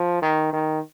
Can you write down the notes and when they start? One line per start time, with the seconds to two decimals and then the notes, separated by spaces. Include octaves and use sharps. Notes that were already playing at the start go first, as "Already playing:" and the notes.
Already playing: F3
0.22 D#3
0.53 D#3